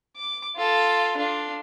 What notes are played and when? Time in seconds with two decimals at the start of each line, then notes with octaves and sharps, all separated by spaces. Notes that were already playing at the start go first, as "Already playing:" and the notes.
0.17 D6
0.56 F4 A4
1.17 D4 F4